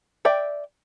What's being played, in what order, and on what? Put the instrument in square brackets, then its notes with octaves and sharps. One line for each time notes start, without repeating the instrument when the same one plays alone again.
[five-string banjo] D5 E5 G5